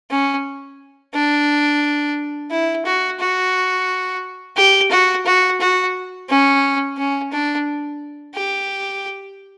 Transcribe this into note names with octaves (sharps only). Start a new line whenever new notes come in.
C#4
D4
E4
F#4
F#4
G4
F#4
F#4
F#4
C#4
C#4
D4
G4